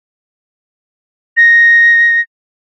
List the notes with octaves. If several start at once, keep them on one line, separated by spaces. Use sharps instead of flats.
A#6